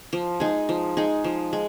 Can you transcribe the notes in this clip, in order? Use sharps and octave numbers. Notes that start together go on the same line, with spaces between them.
F3
G#3 D#4 G#4
F3
G#3 D#4 G#4
F3
G#3